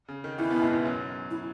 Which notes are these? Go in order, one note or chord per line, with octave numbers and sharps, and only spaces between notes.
C#3
D#3
E2 E3 E4
B2 B3
G#2 G#3
G#2 G#3
F#2 F#3
E4